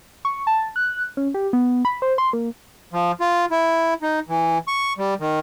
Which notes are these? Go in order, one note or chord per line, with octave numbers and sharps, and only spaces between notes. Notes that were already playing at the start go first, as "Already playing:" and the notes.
C#6
A5
F#6
C#4
G4
B3
B5
C5
C6
A#3
F3
F4
E4
D#4
E3
C#6
G3
D#3